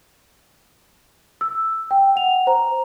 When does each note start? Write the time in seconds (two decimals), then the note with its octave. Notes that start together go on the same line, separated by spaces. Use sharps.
1.41 E6
1.91 G5
2.16 F#5 F7
2.47 C5 A#5